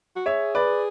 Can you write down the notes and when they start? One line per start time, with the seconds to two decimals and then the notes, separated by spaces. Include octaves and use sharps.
0.16 F#4
0.26 G#4 C#5 E5
0.55 B4 D5